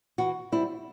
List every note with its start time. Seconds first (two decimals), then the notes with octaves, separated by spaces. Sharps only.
0.18 E3 F#4
0.52 G3 C4 E4